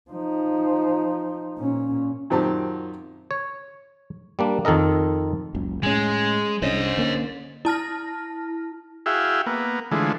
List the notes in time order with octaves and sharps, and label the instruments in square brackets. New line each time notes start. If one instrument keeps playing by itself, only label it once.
[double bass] F3 D#4
A#2 C#4
[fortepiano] F#2 A#2 D#3 C4 G4 A5
[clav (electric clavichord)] C#5
G3 A#3 D4
F2 D#3 A4 A#4 D#5
[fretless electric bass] F#1 C#2
[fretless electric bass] A2 C#4 [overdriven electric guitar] G#3
[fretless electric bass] C2 C#4 D4 [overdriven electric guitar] C5 D#5
[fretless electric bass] D3 A#3 C#4
[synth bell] E4 A5 F6 A#6
[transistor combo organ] E4 F#4 G#4 E5 F5 G5
A#3 B3
D3 E3 F3 G#3 A3